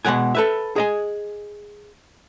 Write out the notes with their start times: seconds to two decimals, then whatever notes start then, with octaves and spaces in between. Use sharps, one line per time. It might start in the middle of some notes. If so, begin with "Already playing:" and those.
0.05 B2 F#3 G#3 F#5 G#5
0.35 A4 B4 E5
0.76 G#4 D#5 G#5